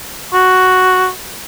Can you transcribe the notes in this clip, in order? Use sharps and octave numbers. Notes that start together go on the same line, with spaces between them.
F#4